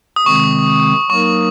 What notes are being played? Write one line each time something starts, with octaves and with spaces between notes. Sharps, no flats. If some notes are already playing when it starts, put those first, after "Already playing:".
D#6
C3 D#3 G#3 C4 C#6
F#3 A#3 D#4 A#4 C#6